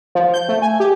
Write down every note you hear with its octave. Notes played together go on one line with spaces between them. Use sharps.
F3
G6
A3
G#5
G4